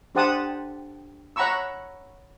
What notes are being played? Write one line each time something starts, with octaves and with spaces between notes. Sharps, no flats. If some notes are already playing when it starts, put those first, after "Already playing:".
D4 G4 C5 F#5 A5 D#6
C#5 F#5 A#5 B5 C#6 E6